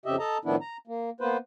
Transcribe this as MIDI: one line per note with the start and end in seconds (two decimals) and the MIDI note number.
0.06 0.16 41
0.06 0.16 49
0.06 0.16 67
0.06 0.16 75
0.06 0.16 76
0.19 0.38 69
0.19 0.38 75
0.19 0.38 81
0.19 0.38 82
0.45 0.56 45
0.45 0.56 51
0.45 0.56 53
0.45 0.56 59
0.45 0.56 62
0.45 0.56 64
0.61 0.77 82
0.87 1.10 58
1.21 1.37 58
1.21 1.37 59
1.21 1.37 71
1.21 1.37 72